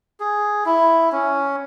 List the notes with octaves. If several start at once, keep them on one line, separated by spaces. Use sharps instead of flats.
G#4
E4
C#4